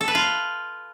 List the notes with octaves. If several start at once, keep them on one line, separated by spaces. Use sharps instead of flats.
A4
B4
F4